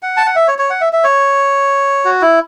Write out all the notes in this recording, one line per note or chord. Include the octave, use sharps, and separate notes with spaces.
F#5
A5
F#5
E5
C#5
C#5
F#5
E5
E5
C#5
F#4
E4